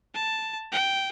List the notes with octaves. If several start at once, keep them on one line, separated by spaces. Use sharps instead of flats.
A5
G5